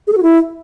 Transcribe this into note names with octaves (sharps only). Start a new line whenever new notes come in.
G#4
A4
F#4
E4